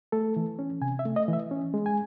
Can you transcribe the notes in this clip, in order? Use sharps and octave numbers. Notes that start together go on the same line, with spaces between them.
A3 A4
E3
C#4
C3 G#5
E5
A3
D#5
E3
E5
C#4
G#3
G#5